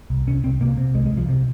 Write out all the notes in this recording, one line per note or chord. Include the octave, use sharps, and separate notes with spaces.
C2
C2 C#4
C2 C4
C3 A#3
C3
C2 G#3
G#3
C2
F3
C3